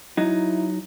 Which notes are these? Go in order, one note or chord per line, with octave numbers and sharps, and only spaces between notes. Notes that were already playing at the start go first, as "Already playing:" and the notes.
F#3 D#4 E4